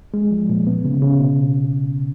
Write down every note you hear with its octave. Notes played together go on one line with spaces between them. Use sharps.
G#3
F3
A#2
B3
C#3
C#3
B2